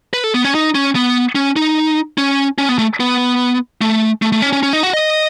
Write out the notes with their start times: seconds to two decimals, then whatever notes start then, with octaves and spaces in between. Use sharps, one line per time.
0.13 B4
0.24 A4
0.34 B3
0.45 C#4
0.55 D#4
0.75 C#4
0.95 B3
1.35 C#4
1.56 D#4
2.18 C#4
2.58 C#4
2.69 B3
2.79 A3
3.00 B3
3.81 A3
4.22 A3
4.32 A3
4.42 C#4
4.53 C#4
4.63 C#4
4.73 D#4
4.83 F#4
4.93 D#5